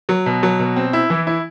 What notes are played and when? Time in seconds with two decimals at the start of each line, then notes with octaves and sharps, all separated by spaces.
0.09 F#3
0.26 B2
0.43 F#3
0.59 B2
0.76 C4
0.93 E4
1.10 E3
1.27 E4